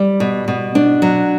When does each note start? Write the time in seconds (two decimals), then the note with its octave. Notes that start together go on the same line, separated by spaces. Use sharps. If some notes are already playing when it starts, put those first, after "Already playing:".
Already playing: G3
0.20 B2
0.48 B2
0.75 D4
1.02 F#3